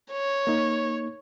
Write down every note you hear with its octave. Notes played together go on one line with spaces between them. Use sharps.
C#5
A#3 D#4